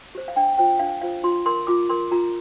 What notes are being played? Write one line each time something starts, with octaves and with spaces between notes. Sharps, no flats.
G4 C5
F5
D4 G5
F4 C5 G5
D4 F5
F4 C5 F5
F4 C6
A#4 C6
F4 D6
A#4 C6
F4 A#5